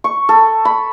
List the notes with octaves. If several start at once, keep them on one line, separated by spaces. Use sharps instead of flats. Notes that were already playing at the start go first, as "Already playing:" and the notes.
C#6
A4
B5